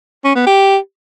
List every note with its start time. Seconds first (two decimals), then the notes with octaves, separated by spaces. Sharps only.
0.24 C#4
0.35 B3
0.46 G4